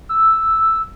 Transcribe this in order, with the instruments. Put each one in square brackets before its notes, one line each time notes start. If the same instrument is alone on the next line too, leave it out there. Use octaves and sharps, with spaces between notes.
[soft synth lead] E6